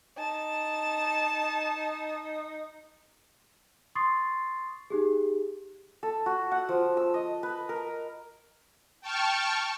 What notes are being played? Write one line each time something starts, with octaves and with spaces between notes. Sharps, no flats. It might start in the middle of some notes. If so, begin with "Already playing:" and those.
D#4 A5
C6 C#6 D#6 A6 C7
D#4 G4 G#4
A4
F#4
F#5
F3
E6
D#5
B4
A#4
G5 A5 C#6 F6